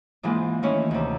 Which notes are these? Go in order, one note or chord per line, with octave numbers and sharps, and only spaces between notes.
G#2 E3 G#3 A#3 C4 F4
D#3 E3 A3 C#4
D2 C3